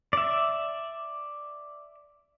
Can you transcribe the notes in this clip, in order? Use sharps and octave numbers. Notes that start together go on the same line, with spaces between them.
D5 E5